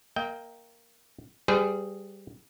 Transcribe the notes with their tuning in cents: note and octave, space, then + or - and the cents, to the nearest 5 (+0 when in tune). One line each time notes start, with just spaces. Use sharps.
A#3 +0 D#5 +45 G5 +0
G3 +0 G#4 +0 B4 +45